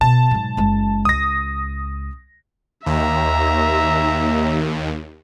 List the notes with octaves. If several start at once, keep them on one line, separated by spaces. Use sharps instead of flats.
B2 A5
G#2 F#3
F#1 G#3
C#2 D#6 A#6
D#2 E5 A#5